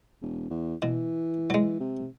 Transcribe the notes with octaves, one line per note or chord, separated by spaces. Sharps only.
E1
E2
B2 E3
F#3 G#3
C3